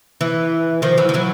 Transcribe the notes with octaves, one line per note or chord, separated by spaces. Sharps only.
E3
D#3 F3
E3 F#3
F3
E3 F#3